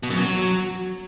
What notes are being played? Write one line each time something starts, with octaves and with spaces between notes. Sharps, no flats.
B2
F#2
F#3